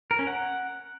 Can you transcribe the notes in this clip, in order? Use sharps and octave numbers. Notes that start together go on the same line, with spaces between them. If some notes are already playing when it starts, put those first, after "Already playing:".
A#4
C#4
F#5